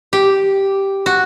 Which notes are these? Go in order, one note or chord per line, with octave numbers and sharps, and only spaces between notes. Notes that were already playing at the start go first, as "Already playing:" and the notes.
G4
F#4